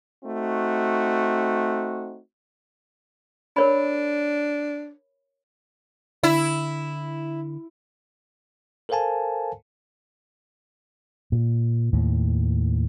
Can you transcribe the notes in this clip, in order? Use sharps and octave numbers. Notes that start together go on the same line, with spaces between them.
A3 C4 D#4 F#4
D4 A#4 C#5 B5
D3 E4
A4 A#4 C5 F5 G#5 A5
A#2
D#2 A2